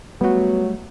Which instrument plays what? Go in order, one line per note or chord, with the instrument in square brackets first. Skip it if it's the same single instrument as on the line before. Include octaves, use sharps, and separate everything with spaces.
[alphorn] F#3 [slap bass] G3 A3 [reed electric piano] B3 F#4